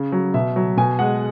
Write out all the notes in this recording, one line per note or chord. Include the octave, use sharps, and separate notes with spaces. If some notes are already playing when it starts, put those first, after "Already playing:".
Already playing: C#3
F#3
B2 E5
F#3
B2 G#5
G#3 F#5